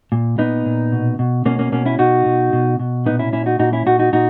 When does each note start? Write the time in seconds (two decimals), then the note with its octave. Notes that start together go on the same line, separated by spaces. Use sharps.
0.12 A#2
0.39 A#2 B3 D#4
0.66 A#2
0.92 B2
1.19 B2
1.45 B2 A#3 C#4
1.59 A#3 C#4
1.72 B2 A#3 C#4
1.86 C#4 E4
1.99 B2 D#4 F#4
2.26 B2
2.53 B2
2.79 B2
3.06 A#2 B3 D#4
3.19 C#4 E4
3.33 A#2 C#4 E4
3.46 D#4 F#4
3.59 A#2 D#4 F#4
3.73 C#4 E4
3.86 A#2 D#4 F#4
3.99 D#4 F#4
4.13 A#2 D#4 F#4